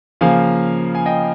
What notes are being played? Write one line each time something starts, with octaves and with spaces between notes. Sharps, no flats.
C#3 F3 A#3 F5 G#5
G#5
D#5 G5